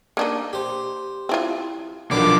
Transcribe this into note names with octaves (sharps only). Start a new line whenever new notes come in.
A#3 D4 D#4
G4 C5
C4 E4 F4
B1 D3 D#3 F3 B3 D6